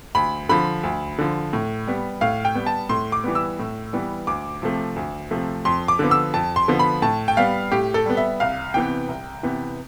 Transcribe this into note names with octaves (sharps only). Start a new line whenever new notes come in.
D2 B5
D3 F3 B5
D2
D3 F3
A2
G3 B3
A2 F5
G5
G3 B3
A5
A2 C6
D6
E3 G3 B3
E6
A2
E3 G3 B3
D2 D6
C3 F3 A3
D2
C3 F3 A3
F2 C6
D6
D3 F3 B3
E6
F2 A5
C6
D3 F3 B3
B5
A2 A5
G5
G3 B3 F5
A2 G4
A4
G3 B3
E5
C2 F5
C3 E3 B3 G5
C2
C3 E3 B3